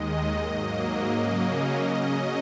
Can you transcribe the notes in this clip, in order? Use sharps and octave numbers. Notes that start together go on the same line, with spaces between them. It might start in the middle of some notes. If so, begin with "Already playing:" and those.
Already playing: D#2 D#3 G#3 D#5
G#2 F#3 A#3
C#3 F#3 A#3 C#4
C#3 F#3 C#4 D#5